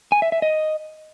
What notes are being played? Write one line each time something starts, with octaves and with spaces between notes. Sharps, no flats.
G#5
E5
E5
D#5